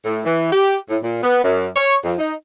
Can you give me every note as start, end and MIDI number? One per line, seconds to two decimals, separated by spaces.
0.05 0.20 45
0.25 0.50 52
0.52 0.77 67
0.89 0.97 45
1.02 1.19 46
1.23 1.41 59
1.43 1.67 42
1.76 1.96 73
2.04 2.13 41
2.18 2.33 63